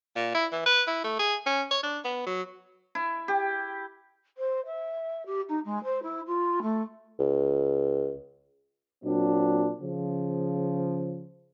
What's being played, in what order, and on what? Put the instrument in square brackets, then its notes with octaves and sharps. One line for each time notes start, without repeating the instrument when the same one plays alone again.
[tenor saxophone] A#2
E4
E3
B4
E4
A3
G#4
C#4
C#5
D4
B3
F#3
[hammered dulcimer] E4
G4
[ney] C5
E5
G4
D#4
G#3
C5
E4
F4
A3
[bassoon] C#2
[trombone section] A#2 F#3 C4 D4
C#3 F3